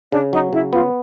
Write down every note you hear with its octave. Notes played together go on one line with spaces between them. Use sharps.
C#3 D4
F#3 D#4
C#3 E4
B3 F4